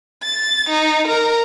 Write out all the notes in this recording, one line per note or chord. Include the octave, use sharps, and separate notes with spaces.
A6
D#4
A#4